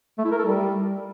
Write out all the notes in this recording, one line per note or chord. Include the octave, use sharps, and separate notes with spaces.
A3
E4
A#4
A4
G3